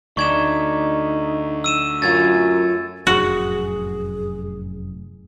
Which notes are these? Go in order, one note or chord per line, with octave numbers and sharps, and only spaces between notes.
D2 A3 D#4 D5 C#6 G#6 E7
E6 D#7 E7
F#2 A3 F4 G#6 A6
F1 F#2 A2 F#4 G#4